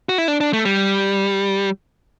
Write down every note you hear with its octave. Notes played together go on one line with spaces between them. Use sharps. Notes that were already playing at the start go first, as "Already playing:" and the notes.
F#4
E4
D4
D4
A3
G3